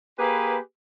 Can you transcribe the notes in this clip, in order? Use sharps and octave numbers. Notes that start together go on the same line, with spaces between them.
A#3 G4 G#4 B4